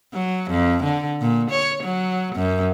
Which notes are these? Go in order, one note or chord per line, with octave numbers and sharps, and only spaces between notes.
F#3
F2
D3
A#2
C#5
F#3
F#2